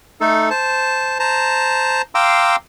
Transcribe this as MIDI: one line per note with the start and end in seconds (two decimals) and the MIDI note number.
0.21 0.50 57
0.21 0.50 63
0.21 0.50 69
0.51 1.18 72
0.51 1.18 81
1.19 2.02 72
1.19 2.02 81
1.19 2.02 82
2.15 2.56 77
2.15 2.56 79
2.15 2.56 82
2.15 2.56 84
2.15 2.56 86
2.15 2.56 88